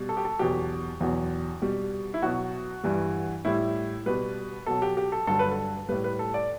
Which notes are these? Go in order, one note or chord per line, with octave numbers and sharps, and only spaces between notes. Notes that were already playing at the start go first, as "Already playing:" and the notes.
Already playing: B2 G3
A4
G4
A4
E2 B2 F#3 G4
E2 B2 F#3
B2 G3
E4
B2 F#3 F#4
G2 E3 G3
A2 G3 E4
B2 G3 B4
B2 F#3 A4
G4
G4
A4
G2 D3 F#3 A4
B4
A4
A2 G3 B4
B4
A4
D5